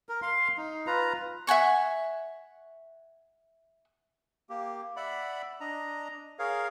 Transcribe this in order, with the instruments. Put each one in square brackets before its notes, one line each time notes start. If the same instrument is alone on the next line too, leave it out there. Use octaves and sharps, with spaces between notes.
[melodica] A#4
F5 C6
D#4
F4 B4 A#5
[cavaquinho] E5 F#5 G#5 C#6
[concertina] A#3 G4
D5 E5 F#5 B5
D4 D#5 A#5
G#4 A#4 C#5 F5